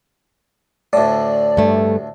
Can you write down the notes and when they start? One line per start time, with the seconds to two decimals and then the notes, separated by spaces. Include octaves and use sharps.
0.93 D2 A2 D5
1.57 G2 A3